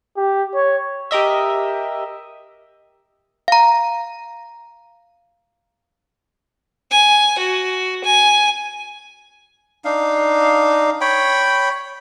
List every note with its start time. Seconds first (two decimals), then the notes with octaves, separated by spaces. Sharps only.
0.17 G4
0.55 C#5
1.11 G4 A#4 D#5 E5
3.48 F5 A#5
6.92 G#5
7.39 F#4
8.05 G#5
9.85 D4 D#4 F5
11.01 C#5 G5 B5